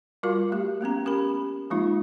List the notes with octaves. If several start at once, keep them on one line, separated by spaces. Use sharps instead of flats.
G3 F4 F#4 A#4 F5
A3 G4
A#3 B3 C#4 A#5
C#4 G4 A#4 B5
F3 G#3 A#3 D#4 F4